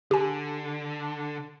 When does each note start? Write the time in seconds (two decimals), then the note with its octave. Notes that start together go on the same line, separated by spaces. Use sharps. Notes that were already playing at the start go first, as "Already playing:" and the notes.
0.11 D3 G4 G#5